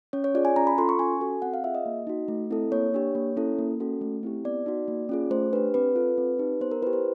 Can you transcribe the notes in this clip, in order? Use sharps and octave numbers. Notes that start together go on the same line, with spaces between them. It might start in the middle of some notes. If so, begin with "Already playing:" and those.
C#4 C#5
C#5
F4 G#4 D5
G#5
C#4 A#5
B5
F4 A4 C6
C#6
C#4 G#5
F#4 A4
C4 F#5
F5
F4 G#4 E5
D#5
A#3
D#4 F#4
A3
C4 E4 A4
A#3 C#5
D4 G4
A#3
C#4 E4 A4
A#3
C#4 F#4 A4
A3
C4 E4 G4
B3 D5
D#4 F#4
A#3
C#4 F4 G#4
A3 C5
D4 G4 B4
C4 B4
F4 A4
C4
D#4 G4
B3 C5
A#4
E4 G4 B4
C5